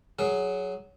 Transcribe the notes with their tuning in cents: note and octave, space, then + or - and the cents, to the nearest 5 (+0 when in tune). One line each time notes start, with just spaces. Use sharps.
F#3 +10 G#4 +10